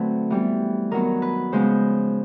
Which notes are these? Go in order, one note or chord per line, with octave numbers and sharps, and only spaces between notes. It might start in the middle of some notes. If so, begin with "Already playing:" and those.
Already playing: D3 F#3 A3 C4 B4
E3 G3 B3
D#3 F#3 B3 A#4
B4
C#3 F3 G#3 B3 C5